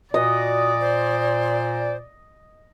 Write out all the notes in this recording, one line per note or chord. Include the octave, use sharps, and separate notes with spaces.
A#2 F#4 D5 D#5
C5